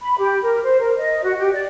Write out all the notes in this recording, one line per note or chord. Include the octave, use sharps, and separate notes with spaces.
B5
G4
A#4
C5
A#4
D#5
F#4
G4
D5